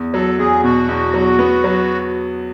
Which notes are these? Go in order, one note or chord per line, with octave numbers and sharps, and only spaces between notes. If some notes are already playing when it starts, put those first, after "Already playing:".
Already playing: E2
F#3 A4
E2 G#4
B2 F#4
E2
F#3
B3
F#3